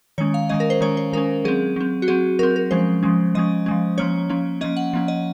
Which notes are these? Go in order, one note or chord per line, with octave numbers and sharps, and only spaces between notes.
D#3 G#3 C#4 C#5
F5
D#3 G#3 C#4 D#5
A#4
C5
D#3 G#3 C#4 C#5
C5
D#3 G#3 C#4 A#4
F#3 C4 G#4
F#3 C4
F#4
F#3 C4 G#4
F#3 C4 A#4
A#4
F3 G#3 C#4 C5
F3 G#3 C#4
F3 G#3 C#4 D#5
F3 G#3 C#4
F3 A#3 C#4 C#5
F3 A#3 C#4
F3 A#3 C#4 D#5
F#5
F3 A#3 C#4
D#5